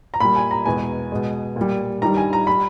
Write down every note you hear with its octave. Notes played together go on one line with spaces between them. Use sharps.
A#5
A#2 G3 B5
G#5
A#5
E2 B2 G#3 G#5
B2 G#3
A#2 G3
G2 D#3 G3 A#5
G#5
A#5
G3 B5